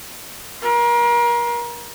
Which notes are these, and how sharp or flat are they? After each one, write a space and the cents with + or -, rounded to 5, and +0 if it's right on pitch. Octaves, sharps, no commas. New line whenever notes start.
A#4 +35 C6 +0